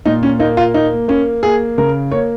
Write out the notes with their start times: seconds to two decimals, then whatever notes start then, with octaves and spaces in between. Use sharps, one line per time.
0.06 A#2 D#4
0.23 C#4
0.39 A#3 D#4
0.57 F4
0.74 A#3 D#4
1.08 A#3 C#4
1.43 A#3 G#4
1.78 C#3 A#4
2.11 A#3 C#5